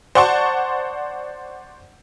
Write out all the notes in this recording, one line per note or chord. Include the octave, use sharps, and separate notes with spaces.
C5 D5 F#5 A5 C6 C#6